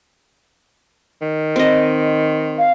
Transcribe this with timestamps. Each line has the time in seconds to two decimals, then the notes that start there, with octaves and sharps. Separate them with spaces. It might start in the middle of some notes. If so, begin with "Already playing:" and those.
1.21 D#3
1.56 C4 D#5
2.59 F5